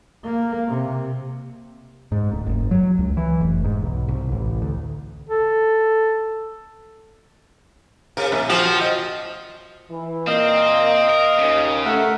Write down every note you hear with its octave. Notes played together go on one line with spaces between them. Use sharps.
A#3
C3
G#2
D1
F#1
F#3
C#2
E3
F1
G#2
B1
C2
A1
D2
A4
C3 A#4
A#1
F3 C4 F#4
D#5
E3
A#2 A#3 C4 D#5 F5
A#4
D#2 C#3
A3 A#4 E5 F#5